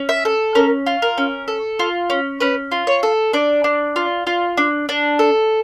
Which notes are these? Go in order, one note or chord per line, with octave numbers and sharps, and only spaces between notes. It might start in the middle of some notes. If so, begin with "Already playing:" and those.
Already playing: C#4
E5
A4
C#4 A#4
F4
A#4
C#4
A4
F4
C#4
C#4 B4
F4
C#5
A4
D4 D5
D4
F4
F4
D4
D4
A4